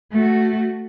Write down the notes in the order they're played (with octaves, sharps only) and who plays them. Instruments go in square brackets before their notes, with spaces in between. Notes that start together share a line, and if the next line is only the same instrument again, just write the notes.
[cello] A3 F#4